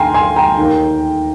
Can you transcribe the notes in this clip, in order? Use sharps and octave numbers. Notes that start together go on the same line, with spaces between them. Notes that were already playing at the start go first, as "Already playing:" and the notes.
Already playing: D2 D#3 F5 G5 G#5 A#5 C6
G#5 C6
G5 A#5
D#2 D#3